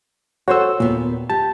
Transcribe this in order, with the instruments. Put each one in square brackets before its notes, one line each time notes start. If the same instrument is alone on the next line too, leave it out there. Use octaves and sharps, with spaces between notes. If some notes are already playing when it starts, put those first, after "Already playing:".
[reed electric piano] F#4 C5 E6 [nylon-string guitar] A4 C#5
[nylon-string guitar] D#2 B3 [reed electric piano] A#2
[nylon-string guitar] G4 [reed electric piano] A5